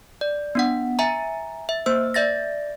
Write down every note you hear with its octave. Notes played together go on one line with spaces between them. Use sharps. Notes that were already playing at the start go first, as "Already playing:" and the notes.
D5
B3 D4 F#5
E5 G#5 A#5
E5
A#3 C5 E6
D5 E5 A6 A#6